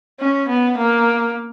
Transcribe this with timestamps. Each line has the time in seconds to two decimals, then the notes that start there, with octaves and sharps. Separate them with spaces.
0.19 C#4
0.48 B3
0.78 A#3